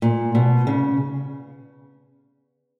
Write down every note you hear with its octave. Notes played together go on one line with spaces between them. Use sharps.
A#2
B2
C#3